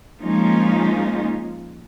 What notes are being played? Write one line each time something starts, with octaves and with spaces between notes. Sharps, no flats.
F3 G#3 A#3 C#4 D#4 F4